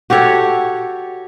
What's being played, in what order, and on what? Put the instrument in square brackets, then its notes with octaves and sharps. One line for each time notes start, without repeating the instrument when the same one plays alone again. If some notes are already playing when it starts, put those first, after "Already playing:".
[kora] F#4 G4 A4 C#5